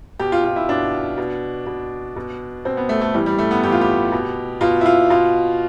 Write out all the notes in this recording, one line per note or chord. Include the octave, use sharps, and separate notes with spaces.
B2 G4
F4
F4
E4
B2 D4
B2
B2
B2
B2 C4
B3
A3
A3
A2 E3 G3
G3
A3
B3
A2 E3 G4
F4
G4
B2
B2 F4
E4
F4
B2 F4